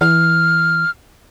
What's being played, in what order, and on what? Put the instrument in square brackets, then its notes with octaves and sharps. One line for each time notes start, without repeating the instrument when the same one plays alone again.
[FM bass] E3 [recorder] F6